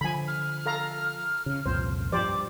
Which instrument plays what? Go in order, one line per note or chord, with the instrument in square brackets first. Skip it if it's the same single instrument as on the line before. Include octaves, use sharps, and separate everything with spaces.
[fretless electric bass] D3 F3 [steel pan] G#5 B5
[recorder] F6
[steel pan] A4 F5 A#5
[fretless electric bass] C#3
[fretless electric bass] C2 F2 A#2 [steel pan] C5
[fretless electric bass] G2 F3 [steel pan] G4 C5 D5 [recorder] D6